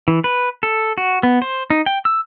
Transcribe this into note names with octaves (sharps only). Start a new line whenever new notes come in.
E3
B4
A4
F#4
B3
C5
D#4
G5
E6